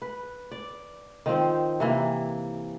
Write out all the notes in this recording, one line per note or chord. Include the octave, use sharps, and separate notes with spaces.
B4
D5
D#3 F3 C4
C3 E3 A#3